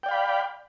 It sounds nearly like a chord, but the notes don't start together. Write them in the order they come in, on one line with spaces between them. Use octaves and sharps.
G5 D5 F5 B5